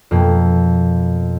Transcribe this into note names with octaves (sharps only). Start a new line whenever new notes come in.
F2 B2 A#3